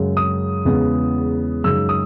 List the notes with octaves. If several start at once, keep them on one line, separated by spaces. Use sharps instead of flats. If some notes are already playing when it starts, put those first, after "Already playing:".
Already playing: F#2 C#3 G#3
D#6
E2 C#3 G#3 B3
F#2 C#3 G#3 D#4 E6
D#6